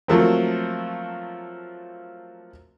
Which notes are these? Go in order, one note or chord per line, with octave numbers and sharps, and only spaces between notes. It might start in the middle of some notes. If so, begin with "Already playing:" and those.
F3 F#3 A3 A#3 C4